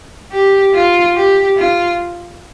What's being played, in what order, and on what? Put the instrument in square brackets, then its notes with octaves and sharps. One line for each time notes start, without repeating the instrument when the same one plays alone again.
[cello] G4
F4
G4
F4